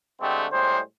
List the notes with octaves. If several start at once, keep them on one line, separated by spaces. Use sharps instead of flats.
D3 G#3 A3 C4 G4
A2 G3 G#3 C5